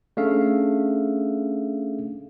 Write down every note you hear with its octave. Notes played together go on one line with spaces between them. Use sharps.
A3 C#4 D4 G#4 E5 F5